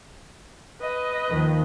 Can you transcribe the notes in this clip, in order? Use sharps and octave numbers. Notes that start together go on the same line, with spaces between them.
B4 D#5
D#2 D#3 F3